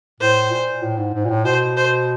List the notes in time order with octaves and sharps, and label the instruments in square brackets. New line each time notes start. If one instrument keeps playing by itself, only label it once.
[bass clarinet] A2 [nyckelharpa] C5
[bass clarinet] A#2
A2
G#2
G#2
A#2
A2
[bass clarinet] B2 [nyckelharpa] C5
[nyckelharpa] C5